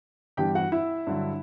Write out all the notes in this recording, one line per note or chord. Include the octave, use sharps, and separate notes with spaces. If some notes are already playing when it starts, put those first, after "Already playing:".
G2 E3 B3 G4 G5
F#4 F#5
E4 E5
G2 D3 F#3